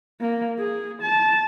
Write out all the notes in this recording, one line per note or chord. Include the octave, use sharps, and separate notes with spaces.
A#3
G#4
A5